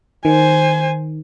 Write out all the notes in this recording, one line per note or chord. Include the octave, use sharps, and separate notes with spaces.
D#3 C5 G#5